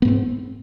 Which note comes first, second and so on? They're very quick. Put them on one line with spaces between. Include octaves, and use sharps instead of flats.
B3 G#2 C4